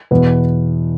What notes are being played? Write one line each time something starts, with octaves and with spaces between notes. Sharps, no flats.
E2 B2 B3 B4